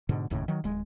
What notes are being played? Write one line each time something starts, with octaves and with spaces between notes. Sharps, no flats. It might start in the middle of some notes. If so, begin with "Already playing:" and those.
G#2 B2 D3
F1 D#2 A2 C#3
D#3 F#3
D1 G#3